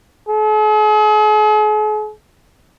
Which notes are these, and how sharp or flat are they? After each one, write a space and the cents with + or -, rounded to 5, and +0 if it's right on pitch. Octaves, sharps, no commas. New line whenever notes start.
G#4 +45